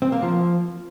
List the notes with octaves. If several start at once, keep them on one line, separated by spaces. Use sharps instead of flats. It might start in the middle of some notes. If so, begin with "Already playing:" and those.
C4
A#3
F3